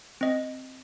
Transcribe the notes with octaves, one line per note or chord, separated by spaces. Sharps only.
C4 D#5